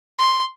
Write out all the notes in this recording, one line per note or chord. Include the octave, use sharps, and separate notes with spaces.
C6